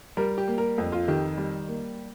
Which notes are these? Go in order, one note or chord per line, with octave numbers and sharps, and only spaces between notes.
G3 A#4
G4
A#3
A#4
F2
F4
D#3 G4
G3
A#3